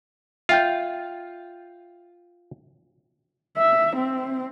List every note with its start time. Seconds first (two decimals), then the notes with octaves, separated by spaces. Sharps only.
0.49 F4 E5 G5 G6
3.58 E5
3.97 C4